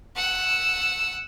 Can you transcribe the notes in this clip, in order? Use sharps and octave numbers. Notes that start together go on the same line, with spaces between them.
F#5 E6